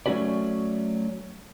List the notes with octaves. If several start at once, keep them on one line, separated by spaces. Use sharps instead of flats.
F#3 A3 C#4 F#4 B4 D5